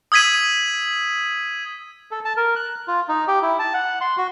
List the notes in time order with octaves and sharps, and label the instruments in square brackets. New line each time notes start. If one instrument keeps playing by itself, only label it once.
[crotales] D#6 E6 G#6 B6 D#7
[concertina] A4
A5
A#4
F#6
F4
D#4
G4
E4
A5
F#5
C6
F#4